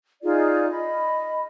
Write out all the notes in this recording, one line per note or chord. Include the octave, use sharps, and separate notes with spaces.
D#4 F4 G#4 D5
D#5 B5